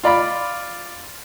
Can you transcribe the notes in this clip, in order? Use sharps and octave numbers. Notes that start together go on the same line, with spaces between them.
F4 D5 B5 D6